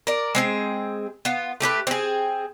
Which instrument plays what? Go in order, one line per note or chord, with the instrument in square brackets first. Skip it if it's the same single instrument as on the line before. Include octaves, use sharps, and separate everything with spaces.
[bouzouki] A#4 D5
G#3 C4 G#4
B3 F4
A3 G4 G#4 B4
C4 G#4